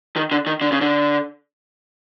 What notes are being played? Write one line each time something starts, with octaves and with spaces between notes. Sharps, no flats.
D#3
D3
D#3
D3
C#3
D3